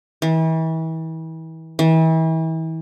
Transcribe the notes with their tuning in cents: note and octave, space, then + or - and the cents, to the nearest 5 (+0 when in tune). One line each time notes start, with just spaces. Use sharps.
E3 -35
E3 -35